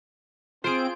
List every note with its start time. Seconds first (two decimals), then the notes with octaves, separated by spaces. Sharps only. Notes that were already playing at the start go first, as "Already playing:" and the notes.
0.64 C4 F4 G#4 C5 C6 D7